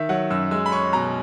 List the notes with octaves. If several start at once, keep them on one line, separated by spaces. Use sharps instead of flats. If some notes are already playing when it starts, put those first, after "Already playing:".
Already playing: D#3 E5
F#3 F#5
F#2 E6
G#3 E6
B5
C#4 C#6
B2 A#5